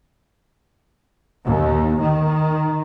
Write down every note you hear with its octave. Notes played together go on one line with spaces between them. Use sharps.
D#2
D#3